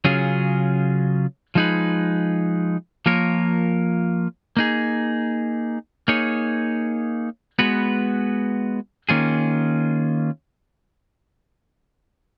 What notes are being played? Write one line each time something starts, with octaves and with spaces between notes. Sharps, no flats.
C#3 F#3 C#4 F4 G#4
F3 G#3 D#4 G#4 B4
F3 A#3 F4 A#4 C#5
A#3 D#4 G#4
A#3 D#4 G#4 C#5
G#3 B3 F#4 B4
D#3 A#3 C#4 F4 G#4